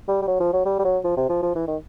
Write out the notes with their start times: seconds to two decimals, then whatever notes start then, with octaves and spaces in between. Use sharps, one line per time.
0.08 G3
0.22 G3
0.28 F#3
0.40 F3
0.53 F#3
0.66 G3
0.79 G3
0.85 F#3
1.04 F3
1.17 C3
1.29 F3
1.42 F3
1.55 E3
1.68 D#3